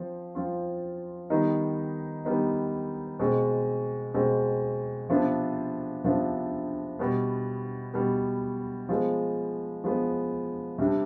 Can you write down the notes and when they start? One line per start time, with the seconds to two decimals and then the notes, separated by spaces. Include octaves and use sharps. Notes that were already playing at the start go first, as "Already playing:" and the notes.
Already playing: F3 C4
0.35 F3 C4 F4
1.30 D#3 G3 B3 D#4
2.25 D#3 G3 B3 D#4
3.19 B2 G#3 C4
4.14 B2 G#3 C4
5.09 C3 F3 B3 D4
6.04 C3 F3 B3 D4
6.99 B2 G3 B3
7.94 B2 G3 B3
8.89 F3 G#3 B3
9.84 F3 G#3 B3
10.78 C3 G3 D4